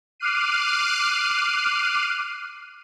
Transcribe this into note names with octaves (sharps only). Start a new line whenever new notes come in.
D6 F6 F#6 C7 D#7